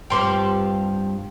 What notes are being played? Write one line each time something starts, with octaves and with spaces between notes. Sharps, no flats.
G2 F3 C4 G5 C6 D6